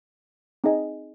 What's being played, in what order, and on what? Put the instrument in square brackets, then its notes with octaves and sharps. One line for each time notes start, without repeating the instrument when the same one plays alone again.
[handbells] C4 D#4 G#4 D#5 G#5